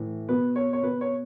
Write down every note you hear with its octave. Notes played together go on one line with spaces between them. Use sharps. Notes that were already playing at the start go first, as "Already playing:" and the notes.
Already playing: A2 E3
B2 B4
C#5
C#5
B2 B4
C#5